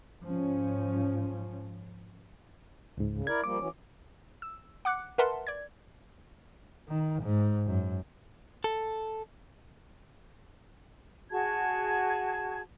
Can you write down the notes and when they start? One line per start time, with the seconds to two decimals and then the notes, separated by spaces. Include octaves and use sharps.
0.24 G#2 F3 C#4
2.98 C#2 G#2
3.12 C#3
3.27 E4 A#4 D5 G#6
3.44 F3 G3 A#3 D6
3.59 E3 F#3 C#4
4.42 E6
4.85 F#5 D6 F#6 C#7
5.18 A#4 B4 E5 F#5 A5 C6
5.47 D5 G#6
6.89 D#3
7.22 G#2
7.67 F#2
8.64 A4
11.31 F#4 G#4 A5 G#6